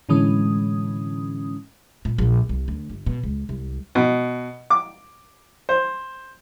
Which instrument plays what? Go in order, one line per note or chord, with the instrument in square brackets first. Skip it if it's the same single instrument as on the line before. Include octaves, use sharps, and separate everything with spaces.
[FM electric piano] A2 D3 E3 G#3 C#4 D#6
[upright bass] A#2
A#1
C2
D2
G1
B2
C#2
C2
[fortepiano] B2
D6
C5